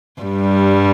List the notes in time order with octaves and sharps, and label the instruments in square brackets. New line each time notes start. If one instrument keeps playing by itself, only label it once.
[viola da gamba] G2 G3